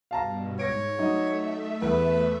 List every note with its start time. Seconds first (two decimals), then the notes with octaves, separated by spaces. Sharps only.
0.11 G2 B2 F5 A5 A#5
0.59 G#2 C#5 G#6 A#6 D7
0.98 F#3 A3 D#4 E5
1.82 E2 B4